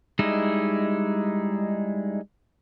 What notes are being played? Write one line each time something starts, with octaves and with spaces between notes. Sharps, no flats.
G3 G#3 D#4 E4